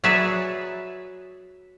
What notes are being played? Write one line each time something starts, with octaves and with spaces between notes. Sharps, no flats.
F#3 F#4 G#4 B4 D5 E5